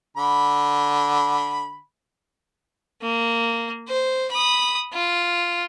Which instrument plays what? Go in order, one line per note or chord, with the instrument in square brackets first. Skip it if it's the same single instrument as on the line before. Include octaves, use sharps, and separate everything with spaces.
[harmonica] D3 B5
[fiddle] A#3
C5
B5 D#6
F4